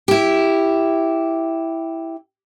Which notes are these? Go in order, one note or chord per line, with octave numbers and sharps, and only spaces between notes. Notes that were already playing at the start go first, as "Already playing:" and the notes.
E4 G4